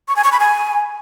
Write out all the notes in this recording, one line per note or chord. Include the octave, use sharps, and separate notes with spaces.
C#6
G#5
C#6
B5
G#5